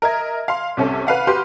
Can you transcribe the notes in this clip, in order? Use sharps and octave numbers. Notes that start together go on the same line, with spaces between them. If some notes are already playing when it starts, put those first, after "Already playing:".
A#4 D#5 E5 G#6
F5 C6
C2 C3 C#4 A4
B4 F5 F#5
F#4 G4 B4 C6 F6